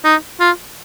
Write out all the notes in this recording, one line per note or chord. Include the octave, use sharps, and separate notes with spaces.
D#4
F4